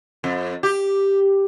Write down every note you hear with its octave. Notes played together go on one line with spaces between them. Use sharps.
F2
G4